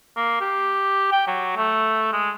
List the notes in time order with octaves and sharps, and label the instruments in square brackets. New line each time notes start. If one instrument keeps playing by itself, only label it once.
[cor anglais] A#3
G4
G5
F#3
A3
G#3